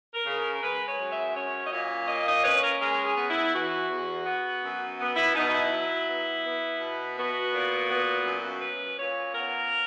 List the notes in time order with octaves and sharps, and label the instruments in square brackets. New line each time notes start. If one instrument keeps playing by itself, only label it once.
[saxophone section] A#4
C#3
A#4
G#3 B4
C#5
F#2
E5
C#4 C#5
D#5
A#2 C#5
A#3 D#5
D#5
C#5
C#4 B4
A#4
G#3 A#4
G#4
B3
E4
E3 F#4
E2
B3
F#2
B3
E4
B2 D#4
D#4
E4
F#3
B3
B3
B2
B3 F#4
A#2
B3
F#2
C#4 B4
A#2 C#5
B3 A#4